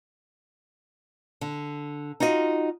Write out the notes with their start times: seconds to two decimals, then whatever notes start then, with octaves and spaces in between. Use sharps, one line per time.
1.41 D3
2.20 D#4 F4 F#4 D#5